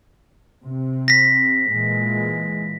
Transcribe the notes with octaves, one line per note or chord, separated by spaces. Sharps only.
C3 C4
A#6 B6
A#2 E3 G#3